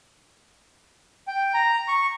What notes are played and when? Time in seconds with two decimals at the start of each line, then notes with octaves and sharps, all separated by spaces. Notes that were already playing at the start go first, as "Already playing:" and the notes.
1.28 G5
1.54 A#5
1.88 C#6